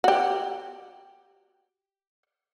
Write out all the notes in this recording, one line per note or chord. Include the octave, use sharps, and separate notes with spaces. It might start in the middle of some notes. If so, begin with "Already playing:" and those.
F#4 G4